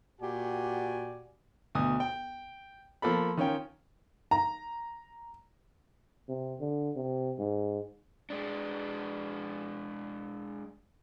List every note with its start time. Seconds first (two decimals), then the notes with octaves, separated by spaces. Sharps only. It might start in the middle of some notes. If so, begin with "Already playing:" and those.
0.21 A#2 F#4 G4 D5 G#5
1.75 D2 B2 D#6
2.00 G5
3.02 F3 A#3 A4 B5
3.37 D#3 C#4 F4 G5
4.31 A#5
6.29 C3
6.60 D3
6.96 C3
7.39 G#2
8.30 G#3 D4